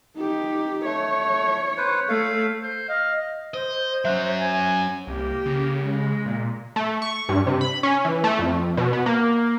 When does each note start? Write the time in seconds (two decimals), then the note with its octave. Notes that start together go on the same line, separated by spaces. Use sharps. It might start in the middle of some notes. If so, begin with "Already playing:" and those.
0.17 D#4 G4
0.85 A3 C#5
1.78 B4 C5
2.09 A3 F5
2.62 C5
2.88 D#5 F5
3.17 D#5
3.54 C5 D#5
4.05 F#3 C#4 E5 F#6
4.40 G#5
5.07 C2 A#3 G4
5.46 C#3
5.84 G#3
6.26 A#2
6.76 A3
7.02 C#6
7.29 G2
7.47 C3
7.61 B5
7.83 C#4
8.05 E3
8.24 A3
8.39 F2
8.77 B2
8.93 B3
9.06 A#3